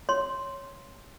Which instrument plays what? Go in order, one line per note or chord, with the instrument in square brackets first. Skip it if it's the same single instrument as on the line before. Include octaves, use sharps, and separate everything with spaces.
[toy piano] C#5 C6